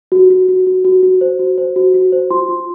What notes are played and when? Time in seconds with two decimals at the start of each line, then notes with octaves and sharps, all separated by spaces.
0.12 F#4
0.30 F#4
0.48 F#4
0.67 F#4
0.85 F#4
1.03 F#4
1.21 C5
1.39 F#4
1.58 C5
1.76 F#4
1.94 F#4
2.12 C5
2.31 F4 C6
2.49 F4